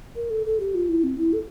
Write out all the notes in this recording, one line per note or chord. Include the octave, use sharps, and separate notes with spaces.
A#4
A4
A4
G4
F4
E4
C4
E4
A4